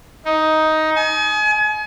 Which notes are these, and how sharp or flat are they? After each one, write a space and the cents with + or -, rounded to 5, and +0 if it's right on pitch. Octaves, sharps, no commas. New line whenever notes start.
D#4 +10
G#5 +35